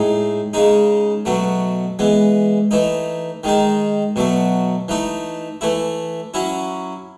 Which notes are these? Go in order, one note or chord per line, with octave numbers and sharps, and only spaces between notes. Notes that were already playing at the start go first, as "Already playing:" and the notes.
Already playing: A2 G#3 D#4
C#3 G#3 D#4
B2 F#3 A3
E3 G#3 B3
E3 A3 D#4
D#3 G#3 D#4
B2 F#3 A3
E3 A3 D#4
E3 A3 E4
F#3 C#4 E4